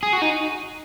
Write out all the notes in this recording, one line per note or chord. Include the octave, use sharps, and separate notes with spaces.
G#4
F#4
D#4